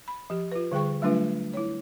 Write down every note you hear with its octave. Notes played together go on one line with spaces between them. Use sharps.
B5
F3 G4
F4 B4
D3 G3 G#4 G5 C#6
F#3 G3 A3 D4 F4 B4
E4 C#5